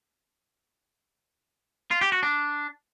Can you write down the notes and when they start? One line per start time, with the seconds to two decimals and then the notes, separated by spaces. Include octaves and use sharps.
1.91 F4
2.01 G4
2.12 F#4
2.23 D4